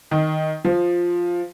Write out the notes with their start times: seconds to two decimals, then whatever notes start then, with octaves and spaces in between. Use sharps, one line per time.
0.11 D#3
0.65 F3